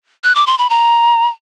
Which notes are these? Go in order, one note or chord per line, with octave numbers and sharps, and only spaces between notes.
F#6
D6
C6
B5
A#5